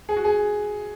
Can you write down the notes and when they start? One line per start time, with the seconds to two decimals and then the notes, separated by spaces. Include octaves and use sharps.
0.09 G#4
0.17 F#4
0.25 G#4